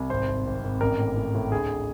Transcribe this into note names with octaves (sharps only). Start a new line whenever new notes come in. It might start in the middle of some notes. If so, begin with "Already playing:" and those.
Already playing: C2
G#1 C5
G#1
G#1
G#1
A1 A#4
A2
A2
A2
D2 G#4